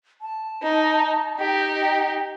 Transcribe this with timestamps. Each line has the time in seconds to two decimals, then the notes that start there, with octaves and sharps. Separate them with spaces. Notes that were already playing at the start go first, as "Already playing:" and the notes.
0.21 A5
0.63 D#4
1.38 D#4 G4 G5